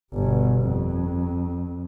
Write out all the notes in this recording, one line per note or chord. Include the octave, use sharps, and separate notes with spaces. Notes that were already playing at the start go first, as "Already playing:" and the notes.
G1 B2
F2